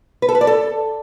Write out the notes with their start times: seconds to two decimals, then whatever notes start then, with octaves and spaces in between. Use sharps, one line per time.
0.22 B4
0.29 A4
0.35 B4
0.41 D5
0.47 A4